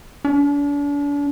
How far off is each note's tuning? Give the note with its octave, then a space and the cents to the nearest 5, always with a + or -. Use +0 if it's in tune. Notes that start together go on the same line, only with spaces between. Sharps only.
D4 -40